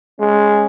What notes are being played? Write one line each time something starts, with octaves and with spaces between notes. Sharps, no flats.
G#3 C#4